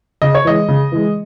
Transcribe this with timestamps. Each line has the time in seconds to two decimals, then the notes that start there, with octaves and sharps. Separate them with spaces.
0.22 C#3 D#5
0.35 C#5
0.45 E3 G#3 D#5
0.68 C#3
0.92 E3 G#3